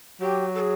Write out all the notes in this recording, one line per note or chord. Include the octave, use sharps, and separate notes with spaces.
F#3 G4
A4
G#4